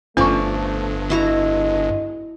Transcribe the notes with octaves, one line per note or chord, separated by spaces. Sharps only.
G1 G2 F3 A3 C#4 D5 C#6
G#3 E4 F#4 D#5 A#5